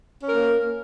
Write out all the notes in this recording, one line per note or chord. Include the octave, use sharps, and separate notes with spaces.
A#3 C#4 A#4